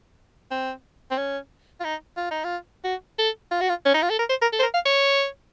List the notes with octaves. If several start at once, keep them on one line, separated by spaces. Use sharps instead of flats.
C4
C4
C#4
F4
D#4
F4
D#4
F4
F#4
A4
F4
F#4
F4
C#4
D#4
F4
A4
A#4
C5
A#4
A4
C5
A#4
F5
C#5